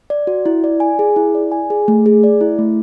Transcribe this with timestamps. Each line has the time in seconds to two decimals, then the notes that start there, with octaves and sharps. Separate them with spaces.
0.10 D5
0.27 F#4
0.46 E4
0.64 D5
0.80 G#5
0.99 G#4
1.16 E4
1.35 D5
1.52 G#5
1.70 G#4
1.88 A3
2.06 G#4
2.24 D5
2.41 E4
2.59 A3